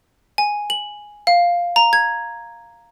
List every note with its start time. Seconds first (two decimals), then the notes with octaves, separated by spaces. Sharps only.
0.38 G#5
0.70 F#7
1.27 F5
1.76 A#5
1.93 G#6